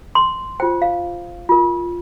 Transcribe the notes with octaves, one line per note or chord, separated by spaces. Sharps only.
C6
F4 C5 G5
F5
F4 A#4